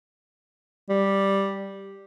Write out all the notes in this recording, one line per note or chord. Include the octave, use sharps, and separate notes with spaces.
G3